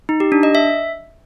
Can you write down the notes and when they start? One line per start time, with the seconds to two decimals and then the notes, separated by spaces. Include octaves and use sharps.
0.09 D#4
0.20 G4
0.32 D4
0.43 D#5
0.55 E5